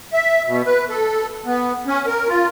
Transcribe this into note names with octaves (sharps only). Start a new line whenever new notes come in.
E5
B2
B4
A4
B3
C#4
A#4
F4